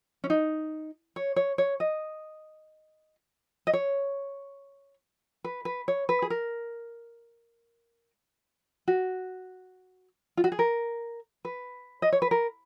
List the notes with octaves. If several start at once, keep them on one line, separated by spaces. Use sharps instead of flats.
C#4
D#4
C#5
C#5
C#5
D#5
D#5
C#5
B4
B4
C#5
B4
G#4
A#4
F#4
F4
F#4
G#4
A#4
B4
D#5
C#5
B4
A#4